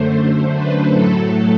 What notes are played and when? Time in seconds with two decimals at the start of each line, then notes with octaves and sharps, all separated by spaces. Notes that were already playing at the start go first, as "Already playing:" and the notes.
Already playing: F#2 D3 A3 C5
0.56 B4
0.91 A2 F#3 A3 A4
1.27 A4